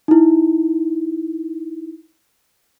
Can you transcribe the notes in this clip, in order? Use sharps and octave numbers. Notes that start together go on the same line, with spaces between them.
D#4 E4